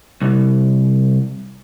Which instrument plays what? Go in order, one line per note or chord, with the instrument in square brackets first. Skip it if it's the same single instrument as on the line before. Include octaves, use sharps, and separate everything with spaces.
[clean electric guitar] C2